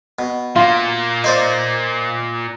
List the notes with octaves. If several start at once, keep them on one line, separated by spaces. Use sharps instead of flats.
B2
A#2 A#3 F4
D#4 C5 D5